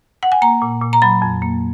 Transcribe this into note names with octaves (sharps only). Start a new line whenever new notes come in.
F#5
G#5
A#3 A#5
A#2
A#2
A#5
F#3 B5
F2
A#3